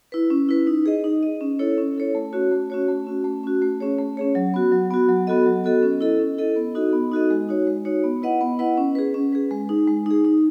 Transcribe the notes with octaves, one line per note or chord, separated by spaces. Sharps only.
E4 B4
C#4
E4 B4
D#4
G#4 D#5
D#4
G#4 D#5
C#4
E4 A4 C#5
C#4
E4 A4 C#5
A3
C#4 F#4 C#5
A3
C#4 F#4 C#5
A3
C#4 F#4
A3
C#4 F#4
A3
C#4 G#4 C#5
A3
C#4 G#4 C#5
F#3
B3 F#4
F#3
B3 F#4
F#3
B3 F#4 A4 D#5
F#3
B3 F#4 A4 D#5
C#4
E4 A4 D#5
C#4
E4 A4 D#5
B3
D#4 F#4 A4 D#5
B3
D#4 F#4 A4 D#5
G#3
D#4 F#4 C#5
G#3
D#4 F#4 C#5
B3
E4 B4 D#5 F#5
B3
E4 B4 D#5 F#5
C#4
G#4 B4
C#4
G#4 B4
G#3
D#4 G#4
G#3
D#4 G#4
D#4